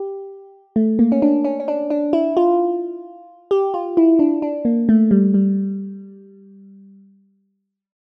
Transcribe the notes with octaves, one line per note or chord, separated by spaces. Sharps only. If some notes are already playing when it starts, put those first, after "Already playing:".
Already playing: G4
A3
A#3
C#4
D4
C#4
C#4
D4
D4
E4
F4
G4
F4
E4
D4
D4
A#3
A3
G3
G3